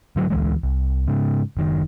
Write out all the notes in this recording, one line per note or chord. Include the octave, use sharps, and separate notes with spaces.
G#2 D3 F#3
D2 E3 G#3
C2
G#2 C#3
F#1 D#3